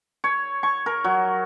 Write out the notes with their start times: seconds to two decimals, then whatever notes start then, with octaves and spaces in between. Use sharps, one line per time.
0.24 C#5
0.63 C#6
0.86 A#4
1.04 F#3